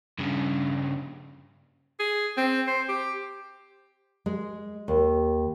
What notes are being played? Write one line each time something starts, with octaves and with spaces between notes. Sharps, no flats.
G2 C#3
G#4
C4
C5
G4
G#3
D#2